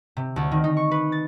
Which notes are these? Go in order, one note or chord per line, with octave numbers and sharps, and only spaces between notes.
C3
D2
D#3
D#4
C#6
B4
A6